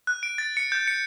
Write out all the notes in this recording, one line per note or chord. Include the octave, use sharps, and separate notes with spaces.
F#6
D7
A6
C#7
G6
C#7